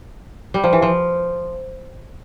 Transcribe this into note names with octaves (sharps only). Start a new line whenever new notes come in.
G3
F3
E3
F3